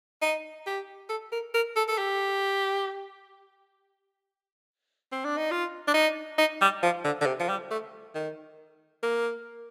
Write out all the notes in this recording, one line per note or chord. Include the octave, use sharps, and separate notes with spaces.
D#4
G4
A4
A#4
A#4
A4
A4
G4
C4
D4
D#4
F4
D4
D#4
D#4
G3
F3
D3
D3
C3
F3
G3
A3
D#3
A#3